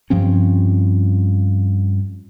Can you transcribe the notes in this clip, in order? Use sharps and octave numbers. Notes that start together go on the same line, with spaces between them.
G2 F3 C4 C#4